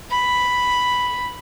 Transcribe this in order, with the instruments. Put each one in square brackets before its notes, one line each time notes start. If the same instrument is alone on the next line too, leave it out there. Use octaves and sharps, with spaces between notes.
[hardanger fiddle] B5